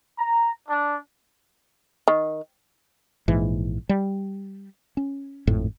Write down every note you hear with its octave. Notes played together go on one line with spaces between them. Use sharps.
A#5
D4
D#3
A#1 G#2 E3
G3
C#4
G#1 F2 A2